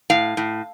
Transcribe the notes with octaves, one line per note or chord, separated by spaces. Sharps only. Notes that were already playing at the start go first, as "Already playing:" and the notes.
A2 F5
A2